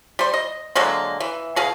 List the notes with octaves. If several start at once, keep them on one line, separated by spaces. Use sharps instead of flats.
G3 C5
D#5
D3 F#3 G#3 A#3
E3
B2 G#4 F5